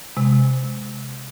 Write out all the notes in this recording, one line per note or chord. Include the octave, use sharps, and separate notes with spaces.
C3 G#3